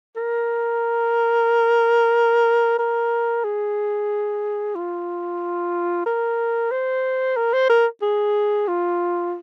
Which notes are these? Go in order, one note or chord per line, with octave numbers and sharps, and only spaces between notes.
A#4
A#4
G#4
F4
A#4
C5
A#4
C5
A#4
G#4
F4